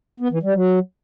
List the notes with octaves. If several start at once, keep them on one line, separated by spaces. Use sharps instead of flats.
B3
E3
G3
F#3